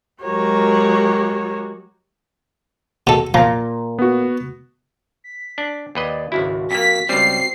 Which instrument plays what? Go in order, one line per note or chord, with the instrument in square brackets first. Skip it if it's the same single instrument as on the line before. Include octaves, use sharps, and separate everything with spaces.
[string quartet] F#3 G#3 F#4 G4 A#4 C#5
[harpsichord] B2 A4
[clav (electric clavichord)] A#2 A#5 [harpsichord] F3
[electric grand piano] B3 F#4
[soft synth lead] B6
[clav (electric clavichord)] D4
[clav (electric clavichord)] D#2 B4 D#5 [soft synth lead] D5
[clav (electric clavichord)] G#1 C#2 E4 [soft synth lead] F#4
[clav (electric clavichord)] F2 A#3 [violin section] B6
[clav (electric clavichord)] C#2 G3 [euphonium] C4 [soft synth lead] F#4 [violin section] C7